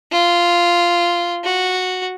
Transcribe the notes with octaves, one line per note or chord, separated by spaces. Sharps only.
F4
F#4